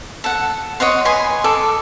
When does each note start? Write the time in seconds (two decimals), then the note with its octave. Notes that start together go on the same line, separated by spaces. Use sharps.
0.24 A4 F#5
0.80 C#5 D#5 F#5 C6
1.05 B4 D#5 G#5 C6
1.44 A4 A5 D6